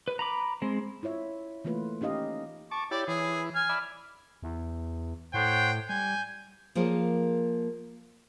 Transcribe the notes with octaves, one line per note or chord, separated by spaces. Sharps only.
B4
A#5 B5 D6
G#3 C4
E4 F4 C#5 E5
E3 A3 A#3 F4 B4
C#4 D#4 G4 D#5 F5
A5 C#6 D6
E4 G4 C#5 D5
E3 G#4 C#5
G#5 F6
D5 E5 B5
E2
A2 C5 C#5 F#5 G5
G3 G#5 G6
F3 A#3 G#4 A#4 C5 C#5